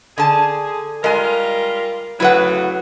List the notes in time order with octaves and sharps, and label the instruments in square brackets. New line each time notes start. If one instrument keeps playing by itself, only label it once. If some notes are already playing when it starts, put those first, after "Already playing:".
[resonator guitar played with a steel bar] D3 A5 [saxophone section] G#4
[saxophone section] G3 F4 A#4 [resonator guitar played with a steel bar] G#3 G#5
[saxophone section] D2 C#3 F#3 [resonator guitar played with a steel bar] E4 B4 F#5